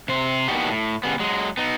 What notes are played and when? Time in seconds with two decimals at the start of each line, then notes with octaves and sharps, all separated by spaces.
0.08 C3 C5
0.48 A#3 B3 D4 D#4 F#4 G4
0.68 A2
1.03 C#3 G3 B3
1.20 F#3 G#3
1.57 B3 D#4